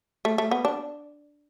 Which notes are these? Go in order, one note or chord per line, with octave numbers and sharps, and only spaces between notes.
A3
A3
B3
D4